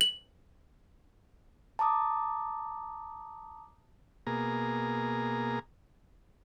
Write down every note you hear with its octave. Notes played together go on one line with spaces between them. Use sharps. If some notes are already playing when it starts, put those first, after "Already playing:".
F#7
A5 A#5 D6 D#6
B2 A#3 G#4 A#5